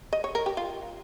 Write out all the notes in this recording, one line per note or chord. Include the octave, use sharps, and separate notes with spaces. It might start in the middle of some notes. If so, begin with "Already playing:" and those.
D#5
C#5
A#4
G4
F4